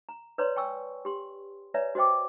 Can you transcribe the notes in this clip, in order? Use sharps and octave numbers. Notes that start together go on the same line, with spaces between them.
A#5
B4 C#5 D5 A#5 C6
G5 G#5 C#6 E6
G4 C6
B4 C#5 D5 E5 G#5 A#5
F#4 C5 D#5 G5 D6